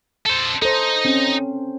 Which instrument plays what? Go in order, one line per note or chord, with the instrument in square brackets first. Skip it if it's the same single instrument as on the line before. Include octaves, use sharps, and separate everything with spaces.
[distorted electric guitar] A4 C5
[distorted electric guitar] D#4 [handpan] A4 C5
[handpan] C4 C#4